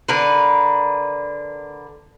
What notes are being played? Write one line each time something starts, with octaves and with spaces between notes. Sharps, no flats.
D3 A#4 B4